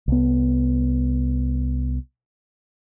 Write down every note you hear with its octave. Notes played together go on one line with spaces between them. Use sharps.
C2 B3